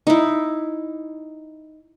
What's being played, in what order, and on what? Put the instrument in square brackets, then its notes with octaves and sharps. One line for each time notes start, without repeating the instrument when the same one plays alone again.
[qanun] D#4 E4